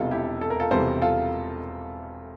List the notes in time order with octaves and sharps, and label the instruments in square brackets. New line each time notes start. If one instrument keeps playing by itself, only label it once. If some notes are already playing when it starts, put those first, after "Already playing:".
Already playing: [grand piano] E1 E2 C3 E3 G3 F4 A4
E4 G4
A4
A#4
F4 A4
E1 E2 C3 E3 G3 A4 C5
F4 A4